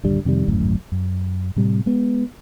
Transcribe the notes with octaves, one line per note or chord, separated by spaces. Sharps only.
D#1 G2 D3 G3
F2 C3 D#3 G3
D1 G#1 F#2 A2
F#2
A2 C3 G3
G#3 B3